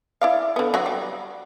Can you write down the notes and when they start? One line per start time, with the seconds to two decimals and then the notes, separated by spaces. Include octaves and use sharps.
0.21 E4 D5 F5
0.56 D3 B3
0.74 F#3 F#4
0.86 G3